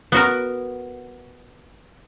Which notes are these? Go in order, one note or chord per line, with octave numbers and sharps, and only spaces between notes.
B3 F#4 A#4